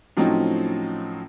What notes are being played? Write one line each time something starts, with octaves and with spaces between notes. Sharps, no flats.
A2 F3 F#3 C4 C#4 D#4